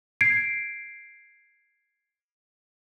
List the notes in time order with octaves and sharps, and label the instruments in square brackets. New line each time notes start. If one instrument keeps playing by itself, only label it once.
[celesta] G#6 C7 D7